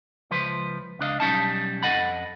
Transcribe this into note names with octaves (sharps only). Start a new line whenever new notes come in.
C#2 F3 B4 C5
C#2 D4 D#5 F5
B1 G3 C#4 D#4 A5
F2 B2 A4 D#5 F#5 B5